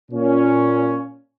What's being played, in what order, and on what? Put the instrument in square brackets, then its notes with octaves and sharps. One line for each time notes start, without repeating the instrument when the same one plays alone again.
[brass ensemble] A#2 C#4